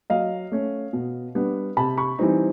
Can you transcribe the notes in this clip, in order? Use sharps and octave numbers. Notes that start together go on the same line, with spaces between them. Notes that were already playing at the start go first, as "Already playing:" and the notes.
F#3 D#5 F5
A3 C#4
B2
G3 B3 D4
C3 A5 B5
B5 C#6
E3 G3 C4 D#4